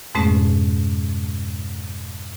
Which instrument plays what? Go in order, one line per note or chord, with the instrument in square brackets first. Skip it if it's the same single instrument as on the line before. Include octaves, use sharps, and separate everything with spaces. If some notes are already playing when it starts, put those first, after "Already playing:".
[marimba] F2 G#2 B2 G#3 A3 C#4